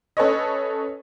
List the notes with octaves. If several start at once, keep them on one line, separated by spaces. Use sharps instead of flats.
C#4 A4 B4 C#5 D#5